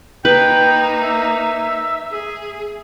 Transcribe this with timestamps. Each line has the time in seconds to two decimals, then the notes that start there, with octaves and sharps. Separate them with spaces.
0.25 A#3 D#4 B4 G5
1.03 E5
2.11 G#4